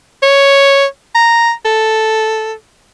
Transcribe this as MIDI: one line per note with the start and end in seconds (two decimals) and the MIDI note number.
0.23 0.85 73
1.15 1.52 82
1.65 2.53 69